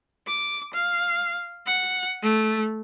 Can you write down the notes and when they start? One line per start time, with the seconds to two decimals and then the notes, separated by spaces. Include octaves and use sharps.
0.27 D6
0.73 F5
1.67 F#5
2.22 A3